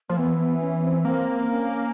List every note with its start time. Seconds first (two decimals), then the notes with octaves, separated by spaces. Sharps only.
0.09 F3 A#3
0.17 E3 B3
0.39 B3
0.61 C#4
0.82 C4
1.05 A#3 C4
1.48 C#4